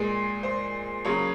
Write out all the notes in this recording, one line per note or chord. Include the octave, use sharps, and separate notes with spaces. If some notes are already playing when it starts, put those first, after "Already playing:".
Already playing: A#2 G#3
C5
C#3 F#3 A#3 C#5